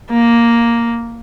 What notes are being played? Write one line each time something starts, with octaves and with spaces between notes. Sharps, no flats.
A#3